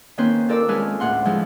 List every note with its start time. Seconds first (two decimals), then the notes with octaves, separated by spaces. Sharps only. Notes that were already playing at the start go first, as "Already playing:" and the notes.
0.18 D#3 A#3 C4 C#4 B4 C5
0.49 F4 A4 A#4 D5 E6
0.68 G#3 C#4 B4 G#5 A5 F6
1.00 D2 A2 F#5 C6
1.25 E3 F3 G#3 E4